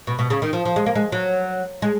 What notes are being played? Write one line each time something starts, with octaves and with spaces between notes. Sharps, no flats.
B2
B2
C#3
D#3
F3
F3
G#3
A#3
G#3
F#3
G#3